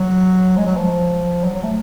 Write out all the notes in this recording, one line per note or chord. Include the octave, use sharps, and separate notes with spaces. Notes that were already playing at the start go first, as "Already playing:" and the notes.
Already playing: F#3
G#3
F#3
F3
F#3
F#3
A3